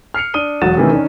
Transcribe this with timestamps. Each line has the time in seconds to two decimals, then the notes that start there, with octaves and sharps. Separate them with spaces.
0.14 F6 C7 C#7 F7
0.34 D4 D#6 D#7 G7
0.62 E1 F#3 F#4 A6 E7
0.77 C3 D#3 E3 A3 C#4
0.91 D#3 C#4 D4